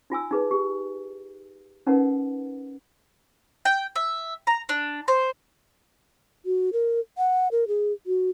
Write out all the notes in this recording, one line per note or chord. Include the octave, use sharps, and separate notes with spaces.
D#4 F4 G#5 E6
D#4 G#4 B4
G4
C#4 D#4 A#4 B4 F#5
G5
E5
A#5
D4
C5
F#4
A#4
F#5
A#4
G#4
F#4